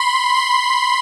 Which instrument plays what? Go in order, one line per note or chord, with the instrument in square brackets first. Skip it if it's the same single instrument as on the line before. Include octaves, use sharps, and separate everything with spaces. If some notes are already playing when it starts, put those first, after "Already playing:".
Already playing: [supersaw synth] B5 C6
C6